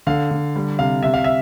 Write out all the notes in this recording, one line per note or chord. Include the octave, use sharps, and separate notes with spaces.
D3 F5
D3
G3
C3 F5
C3 E5
F5
E5